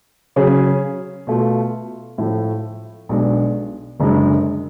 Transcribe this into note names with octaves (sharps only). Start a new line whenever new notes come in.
C#3 F#3 C#4 G#4
B2 A3 F4
A2 F3 A3
B1 B2 G#3 D4
F#1 F#2 D3 G#3